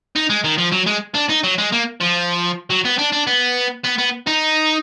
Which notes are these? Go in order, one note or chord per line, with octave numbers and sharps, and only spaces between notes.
D#4
G#3
D#3
F3
F#3
G#3
D4
D#4
F#3
G#3
A#3
F3
F#3
B3
D4
D4
B3
B3
B3
D#4